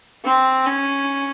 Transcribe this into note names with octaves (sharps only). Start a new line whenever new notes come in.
C4
C#4